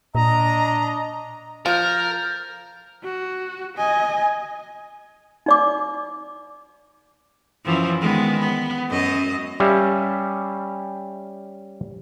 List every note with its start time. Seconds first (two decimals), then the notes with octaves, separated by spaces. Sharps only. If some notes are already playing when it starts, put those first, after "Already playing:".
0.15 A#2 D4 D#5 A#5
1.66 F3 A#4 F6 G6 A6
3.04 F#4
3.77 D#5 G#5
5.46 D#4 D5 D6
7.65 F#2 E3 F3
8.01 D#3 G#3 B3
8.40 B3
8.89 F#2 D#5
9.60 G3 C#4 E5 F5